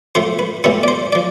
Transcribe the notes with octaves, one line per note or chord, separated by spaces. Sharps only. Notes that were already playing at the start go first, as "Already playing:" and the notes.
A2 F3 A3 C5
B4
A2 E3 G3 B3 A4
D5
C5
F3 D5